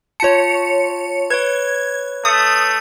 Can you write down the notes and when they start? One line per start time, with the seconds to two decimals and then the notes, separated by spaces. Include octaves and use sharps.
0.20 F4 C#5 A5 C#7
1.30 B4 C#5 G#6
2.25 A3 D#6